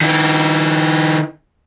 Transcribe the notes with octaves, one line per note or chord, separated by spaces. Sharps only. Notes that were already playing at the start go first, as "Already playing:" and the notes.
D#3 E4